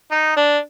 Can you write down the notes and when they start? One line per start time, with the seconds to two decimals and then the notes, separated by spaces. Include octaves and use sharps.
0.11 D#4
0.36 D4